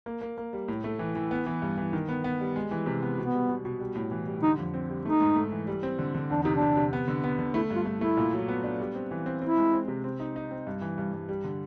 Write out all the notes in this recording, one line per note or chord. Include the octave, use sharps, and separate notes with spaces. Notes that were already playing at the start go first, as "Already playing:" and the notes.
A#3
A#3
A#3
G3
A2
A3
E3
E3
B3
E3
G2
E3
D#3
B3
B3
G3
G#3
E3
C3
B3
B2 B3
G3
B2
B2
G3
A2
E3
G3
D3 D#4
F2
C4
G3
A3 D#4
G#2
A3
E3
G3
C4
D3
D3
E2 D4
C3 D#4
D4
C3
C3
B3
D3
B3
D3
A3 E4
G2 F4
A3
E4
A3
A#2
F#3
B3
D4
G3
C4
E3
C4
C4 E4
G#3
C4
C3
C4
D#4
D#4
C4
G2
E3
G2
G2
G3
D3